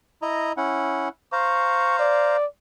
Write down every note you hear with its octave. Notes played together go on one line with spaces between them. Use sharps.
E4 D#5 A#5
C#4 E4 F#5
C5 F5 A#5 C#6
D5